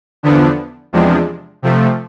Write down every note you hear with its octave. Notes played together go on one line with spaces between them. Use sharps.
E2 D3 F3 B3 D4
E2 C3 F3 G#3 D4
C3 F3 A3